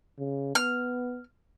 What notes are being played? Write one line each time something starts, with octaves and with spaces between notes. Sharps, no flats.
C#3
B3 F6